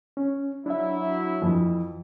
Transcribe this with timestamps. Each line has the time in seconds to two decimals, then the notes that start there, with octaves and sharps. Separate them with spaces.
0.17 C#4
0.66 F#3 D4 E4 E5
1.42 F2 E3